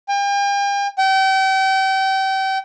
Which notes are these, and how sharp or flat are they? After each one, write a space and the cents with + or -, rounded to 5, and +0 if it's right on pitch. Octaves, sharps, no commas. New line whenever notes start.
G5 +40
G5 -35